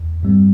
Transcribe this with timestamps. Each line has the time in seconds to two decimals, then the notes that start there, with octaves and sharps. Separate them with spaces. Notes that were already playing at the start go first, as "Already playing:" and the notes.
Already playing: E2
0.23 G2 G3 C4